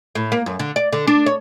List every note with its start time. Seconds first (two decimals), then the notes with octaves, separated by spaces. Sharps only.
0.15 A2
0.32 A#3
0.46 F#2
0.59 D3
0.76 D5
0.93 D3
1.07 D4
1.26 C#5